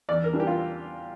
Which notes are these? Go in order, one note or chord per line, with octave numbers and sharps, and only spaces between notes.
E2 D5
A#4
E3 G3 D4
G4
F4